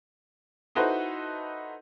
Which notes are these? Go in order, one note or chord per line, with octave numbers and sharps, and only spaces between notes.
D#4 E4 F#4 A4 B4 C5